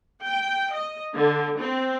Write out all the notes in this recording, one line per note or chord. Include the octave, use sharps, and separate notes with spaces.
G5
D#5
D3
C4